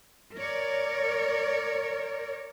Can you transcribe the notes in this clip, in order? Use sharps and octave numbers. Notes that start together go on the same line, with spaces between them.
A#4 C#5 D5